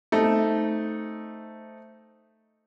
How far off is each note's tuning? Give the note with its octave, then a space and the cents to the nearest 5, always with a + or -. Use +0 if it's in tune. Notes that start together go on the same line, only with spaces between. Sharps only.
A3 +0 C4 +0 D#4 +0